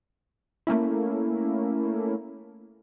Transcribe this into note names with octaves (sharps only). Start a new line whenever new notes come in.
A3 A#3 C#4 E4